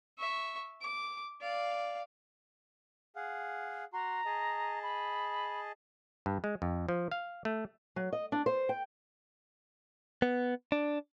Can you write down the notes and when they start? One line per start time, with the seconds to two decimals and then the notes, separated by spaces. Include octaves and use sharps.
0.19 E5 C#6
0.81 D6
1.41 D5 F5
3.16 G#4 F5 F#5
3.93 F#4 A#5 C6
4.26 G#4 D#5 A5
4.83 B5
6.26 G2
6.44 G#3
6.62 F2
6.89 F3
7.12 F5
7.45 A3
7.96 F#3
8.13 D#5
8.32 D4
8.46 C5
8.69 G5
10.22 B3
10.72 D4